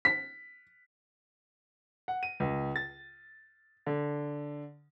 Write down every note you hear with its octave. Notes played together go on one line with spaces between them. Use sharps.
B6
F#5
D#7
C#2
A6
D3